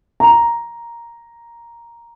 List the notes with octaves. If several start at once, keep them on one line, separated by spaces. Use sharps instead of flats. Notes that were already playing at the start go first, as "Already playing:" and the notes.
A#5